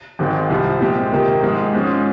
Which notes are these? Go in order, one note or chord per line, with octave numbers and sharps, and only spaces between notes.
G#1 G#2 D#3 G#3 C4
C2 C3 F3
A#2 F3 G#3 C4 G4
C3 D#3 A#3 D#4 G4
G#2 F3 G#3
G#2 F3 G#3 C#4